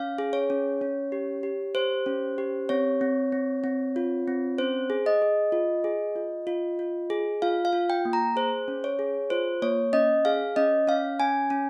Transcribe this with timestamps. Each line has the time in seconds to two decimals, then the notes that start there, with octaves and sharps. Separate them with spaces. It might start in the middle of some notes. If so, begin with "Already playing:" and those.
Already playing: C#4 F5
0.18 G#4
0.33 C#5
0.50 C#4
0.81 C#4
1.12 G4
1.43 G4
1.75 G4 C5
2.06 C#4
2.38 G4
2.69 C4 C#5
3.01 C4
3.32 C4
3.64 C4
3.96 F4
4.28 C4
4.58 C#4 C5
4.90 G#4
5.06 D#5
5.22 G#4
5.52 F4
5.84 G#4
6.16 F4
6.47 F4
6.79 F4
7.10 G#4
7.42 F4 F5
7.65 F5
7.73 F4
7.90 G5
8.05 A#3
8.13 A#5
8.36 G#4 C5
8.68 C#4
8.84 C#5
8.99 G#4
9.30 F4 C5
9.62 A#3 C#5
9.93 C#4 D#5
10.25 G#4 F5
10.56 C#4 D#5
10.87 C#4 F5
11.20 C#4 G#5
11.50 C#4